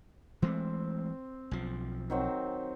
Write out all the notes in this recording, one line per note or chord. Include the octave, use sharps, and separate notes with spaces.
E3 G#3 A3 C4
B1 F3
D#3 F#3 C4